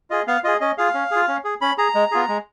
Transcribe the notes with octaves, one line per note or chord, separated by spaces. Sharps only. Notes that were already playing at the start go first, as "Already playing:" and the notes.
F4 G#4 D#5
B3 F5
F4 G#4 D#5
C#4 D#5
F4 G#4 F5
C#4
F4 G#4
C#4
G#4
C#4 B5
G#4 A#5
G#3
B3 F4 G#4
G#3